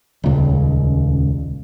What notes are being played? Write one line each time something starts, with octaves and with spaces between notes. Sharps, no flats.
D#1 C#2